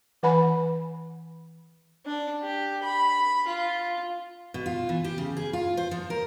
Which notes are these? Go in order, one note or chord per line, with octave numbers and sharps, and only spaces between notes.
E3 B4 F#5 G#5 B5
D4
G4
B5
F4
B2
F4
E3
G4
C#3
G#4
F4
C5
F3
A#4